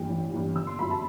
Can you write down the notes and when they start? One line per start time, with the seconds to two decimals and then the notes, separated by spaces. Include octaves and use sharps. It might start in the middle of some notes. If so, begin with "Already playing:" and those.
Already playing: G2 E3 G5
0.09 A1
0.32 G2 E3
0.55 G1 E6
0.67 C6
0.79 F#2 F#3 B5
0.90 A5